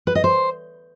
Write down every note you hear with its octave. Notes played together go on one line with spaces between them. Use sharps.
B4
D#5
C5